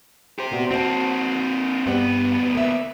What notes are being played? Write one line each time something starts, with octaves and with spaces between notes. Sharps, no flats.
G4 C5
A#2 B3 F#4
A#3 C4 F#4 D#5 A5
D2 G2 B3 G4
A#3 E5